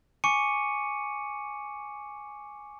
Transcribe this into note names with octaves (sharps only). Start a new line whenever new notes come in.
G#5 C#6 D6 C#7 D#7